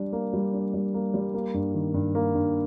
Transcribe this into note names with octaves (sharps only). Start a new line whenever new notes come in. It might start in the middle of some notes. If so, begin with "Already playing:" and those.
Already playing: G3 D4
A#3
G3
D4
G3
A#3
G3
A#3
G2
D#3
G2
A#3
G2